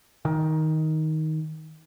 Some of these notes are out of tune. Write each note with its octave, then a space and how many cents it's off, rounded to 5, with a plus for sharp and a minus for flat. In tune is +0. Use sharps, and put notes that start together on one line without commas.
D#3 +10